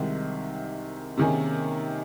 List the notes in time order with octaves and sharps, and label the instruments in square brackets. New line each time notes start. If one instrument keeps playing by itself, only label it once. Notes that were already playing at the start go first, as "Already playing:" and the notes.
Already playing: [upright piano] C2 C3 D#3 G#3
C3 D#3 A#3 C#4 G#4